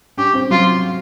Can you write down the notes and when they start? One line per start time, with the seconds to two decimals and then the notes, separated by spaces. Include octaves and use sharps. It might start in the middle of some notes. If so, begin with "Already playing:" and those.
0.17 C#4 G4
0.34 C4
0.50 F#3 F4